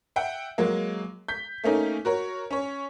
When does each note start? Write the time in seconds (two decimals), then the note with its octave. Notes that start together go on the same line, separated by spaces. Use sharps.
0.16 E5 F#5 G5
0.58 F#3 G#3 A#3
1.28 G6 B6
1.64 A3 A#3 C#4 D#4
2.05 F#4 A#4 C#5
2.51 C#4 C#5